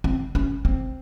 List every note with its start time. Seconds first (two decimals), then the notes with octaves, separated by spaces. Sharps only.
0.04 C4
0.35 C#4
0.65 C4